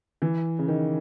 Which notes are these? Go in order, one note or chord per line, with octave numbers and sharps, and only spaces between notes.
E3
C#3
D#3